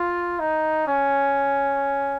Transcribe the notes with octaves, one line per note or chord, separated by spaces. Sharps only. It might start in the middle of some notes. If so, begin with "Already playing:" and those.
Already playing: F4
D#4
C#4